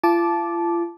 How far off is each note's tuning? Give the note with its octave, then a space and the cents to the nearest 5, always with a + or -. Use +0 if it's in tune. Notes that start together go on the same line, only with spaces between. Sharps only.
F4 -40 A5 -15 D6 +0